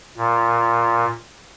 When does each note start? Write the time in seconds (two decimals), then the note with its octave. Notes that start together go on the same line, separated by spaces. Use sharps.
0.17 A#2